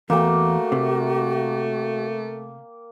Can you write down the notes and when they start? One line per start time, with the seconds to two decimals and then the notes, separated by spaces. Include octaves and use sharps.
0.10 E2 A3 A#3 F#4 G5
0.72 C3